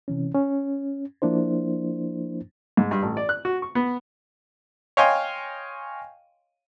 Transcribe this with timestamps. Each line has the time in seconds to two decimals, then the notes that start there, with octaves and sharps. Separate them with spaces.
0.08 C3 E3 C#4
0.34 C#4
1.22 F3 A#3 D4 E4 C5
2.77 G#2
2.91 G2
3.02 A1
3.17 D5
3.29 F#6
3.45 F#4
3.62 C#6
3.75 B3
4.97 C#5 D#5 F5 G5 G#5 C6